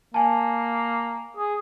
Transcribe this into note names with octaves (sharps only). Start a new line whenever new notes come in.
A#3 G#5 A5
G#4